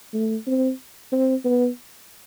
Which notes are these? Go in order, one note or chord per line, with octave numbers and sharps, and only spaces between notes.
A3
C4
C4
B3